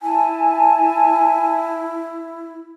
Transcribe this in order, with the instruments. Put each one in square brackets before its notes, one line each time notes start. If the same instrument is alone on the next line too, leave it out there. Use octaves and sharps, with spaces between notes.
[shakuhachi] E4 [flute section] G#5 A5